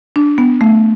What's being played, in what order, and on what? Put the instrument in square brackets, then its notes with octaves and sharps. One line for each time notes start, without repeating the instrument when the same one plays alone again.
[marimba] D4
B3
A3